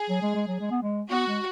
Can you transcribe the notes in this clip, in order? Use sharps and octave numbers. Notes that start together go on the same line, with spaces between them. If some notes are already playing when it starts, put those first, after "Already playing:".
Already playing: G#4
F#3
G#3
G#3
F#3
G#3
B3
G#3
B3 F#4
G#3